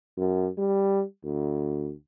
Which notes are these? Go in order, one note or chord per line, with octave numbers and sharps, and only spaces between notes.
F#2
G3
D2